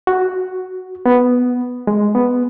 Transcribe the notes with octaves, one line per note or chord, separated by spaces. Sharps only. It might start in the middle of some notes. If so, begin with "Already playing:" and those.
F#4
B3
G#3
B3